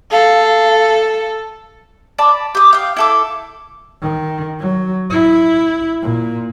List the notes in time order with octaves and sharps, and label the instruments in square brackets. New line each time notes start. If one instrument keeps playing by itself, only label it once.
[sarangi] A4 [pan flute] F5
[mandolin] D5 A5 B5
G4 D#6
F5 G5
E4 A4 D6
[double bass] D#3
F#3
E4
A#2